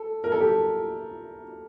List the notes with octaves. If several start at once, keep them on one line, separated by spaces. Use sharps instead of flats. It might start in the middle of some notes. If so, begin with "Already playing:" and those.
Already playing: A4
A#4
A4
G4